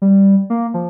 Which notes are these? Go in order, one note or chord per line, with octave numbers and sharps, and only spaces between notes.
G3
A#3
F3